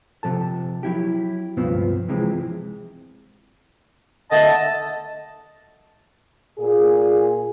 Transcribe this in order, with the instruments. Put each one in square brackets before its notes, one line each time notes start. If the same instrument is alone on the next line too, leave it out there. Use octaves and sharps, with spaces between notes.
[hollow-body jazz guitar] C3 F3 A4 A5
F#3 E4 G4
C#2 G2 B2 F3 B3 C4
C3 E3 F3 G#3 C4
[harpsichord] D3 A3 A4 [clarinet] D#5 [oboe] A5
[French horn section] A#2 G#4